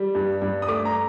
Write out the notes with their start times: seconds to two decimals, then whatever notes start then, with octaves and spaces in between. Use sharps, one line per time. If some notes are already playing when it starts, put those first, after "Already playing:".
Already playing: G3
0.15 G2
0.42 G2
0.62 D#6
0.68 A3 D6
0.85 A#5